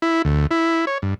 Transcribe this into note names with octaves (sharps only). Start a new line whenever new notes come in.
E4
D2
E4
C#5
G2